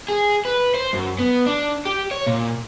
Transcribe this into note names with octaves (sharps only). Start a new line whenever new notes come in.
G#4
B4
C5
F#2
B3
D4
G4
C#5
A#2